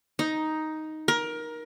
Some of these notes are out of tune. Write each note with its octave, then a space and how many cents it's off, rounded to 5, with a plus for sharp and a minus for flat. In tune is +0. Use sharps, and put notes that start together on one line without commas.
D#4 +5
A#4 +20